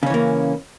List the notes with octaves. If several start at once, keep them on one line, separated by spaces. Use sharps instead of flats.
C#3 E3 A#3 C#4